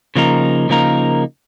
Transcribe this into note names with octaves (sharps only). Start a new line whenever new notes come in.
C#3 F3 A#3 D#4 A#4
C#3 F3 A#3 D#4 A#4